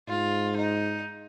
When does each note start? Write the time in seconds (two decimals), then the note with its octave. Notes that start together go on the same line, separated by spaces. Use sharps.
0.09 G#2 F4
0.57 D#4